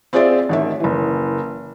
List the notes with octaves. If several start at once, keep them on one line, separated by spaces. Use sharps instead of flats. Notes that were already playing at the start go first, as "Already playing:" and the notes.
C4 F4 G#4 C5 D5 E5
A1 D#3 E5
F#1 E3